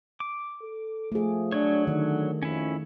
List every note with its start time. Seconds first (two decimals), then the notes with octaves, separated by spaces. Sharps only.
0.20 D6
0.62 A4
1.12 F3 A3 G#4
1.52 F#3 D4 C#5
1.87 D3 D#3
2.43 F2 C#4 E4